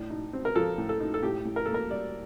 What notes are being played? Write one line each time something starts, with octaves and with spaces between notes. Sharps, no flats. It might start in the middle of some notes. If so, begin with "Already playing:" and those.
Already playing: A2 D4
D#4
C4
A#4
F3 A4
A2
A4
D#4
A4
A2 G4
A2
A#4
A#3 A4
A#4
G3 D5